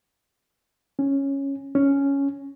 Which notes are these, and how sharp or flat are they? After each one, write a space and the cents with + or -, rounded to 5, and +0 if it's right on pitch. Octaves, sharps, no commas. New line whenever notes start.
C#4 -5
C#4 +5